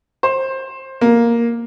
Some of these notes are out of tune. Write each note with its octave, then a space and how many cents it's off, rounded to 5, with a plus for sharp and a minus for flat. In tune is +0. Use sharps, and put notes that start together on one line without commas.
C5 +20
A#3 +5